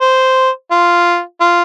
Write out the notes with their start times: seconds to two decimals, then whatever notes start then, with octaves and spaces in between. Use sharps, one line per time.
0.01 C5
0.71 F4
1.41 F4